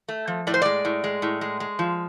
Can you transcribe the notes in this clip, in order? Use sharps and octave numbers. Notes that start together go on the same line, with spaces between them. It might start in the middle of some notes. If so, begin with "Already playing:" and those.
A3
F3
A2 D5
C5
G#3 D5
A2
G#3
A2
G#3
G#3
F3